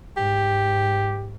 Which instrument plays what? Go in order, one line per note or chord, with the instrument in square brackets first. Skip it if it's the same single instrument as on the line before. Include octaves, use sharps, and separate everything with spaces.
[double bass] G#2 [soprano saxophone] G4